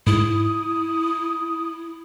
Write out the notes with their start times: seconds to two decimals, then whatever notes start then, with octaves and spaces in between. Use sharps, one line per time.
0.07 G#2 E4 D#6